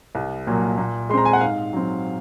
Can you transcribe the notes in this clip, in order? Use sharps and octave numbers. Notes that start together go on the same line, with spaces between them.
C2
A#2 F#3 A#3
A#2
G#3 C4 A#5 C6
G#5
F#5
G#2 F5
F#3 C4